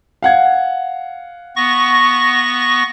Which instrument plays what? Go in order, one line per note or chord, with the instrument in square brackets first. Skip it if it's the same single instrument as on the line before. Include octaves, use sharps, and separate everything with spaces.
[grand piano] F5 F#5 G#6
[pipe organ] B3 C#6 A#6